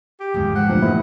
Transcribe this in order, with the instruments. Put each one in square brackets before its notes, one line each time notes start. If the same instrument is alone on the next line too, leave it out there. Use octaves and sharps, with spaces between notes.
[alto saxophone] G4
[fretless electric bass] G#1 E2 [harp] D3 F3 G#3
[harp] B4 C5 [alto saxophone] F#5
[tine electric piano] G2 A#2 F3 [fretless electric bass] A3 [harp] A#3 E4 G5
[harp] G2 D#5 [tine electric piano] E4